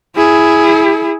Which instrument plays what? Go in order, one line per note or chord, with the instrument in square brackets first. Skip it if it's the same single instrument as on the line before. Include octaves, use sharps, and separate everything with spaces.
[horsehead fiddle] E4 G#4